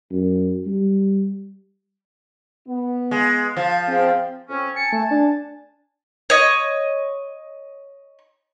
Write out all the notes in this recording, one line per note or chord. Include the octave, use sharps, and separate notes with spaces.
F#2
G3
B3
G#3
F3
C4 G#4
F2 C4 C#4
G#5 A5 C#7
A3
D4
C#5 D#5